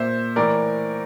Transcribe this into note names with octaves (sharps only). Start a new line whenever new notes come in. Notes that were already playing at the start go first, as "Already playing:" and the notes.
Already playing: A#2 C5 E5
A2 E3 A#4 D5